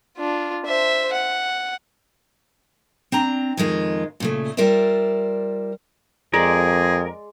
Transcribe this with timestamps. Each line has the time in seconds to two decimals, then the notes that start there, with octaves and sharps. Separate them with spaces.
0.18 D4 F4
0.66 C5 E5
1.13 F#5
3.12 C4 D4 A#5
3.57 F2 D#3 G#3 F4
4.20 A#2 C#3 A3
4.57 G3 F4 A#4 C5 D5 E5
6.34 F2 G#3 G#4 A#4 D5